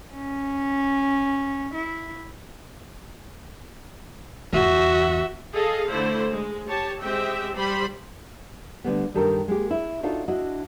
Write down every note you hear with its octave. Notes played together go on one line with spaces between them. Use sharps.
C#4
E4
G1 E2 F#4 E5
G#4 A4 D#5 F5
D3 A3 E4 C5
G#3
G4 C#5 A5
G#3 C4 G4 E5 G5
G3 G4 C5 B5 C6
D3 G3 A3 B3
G2 D#3 G4 A4 A#4
G#3 A#3 G4
E4
D4 D#4 F4 F#4 A4
D4 E4 F#4 D#5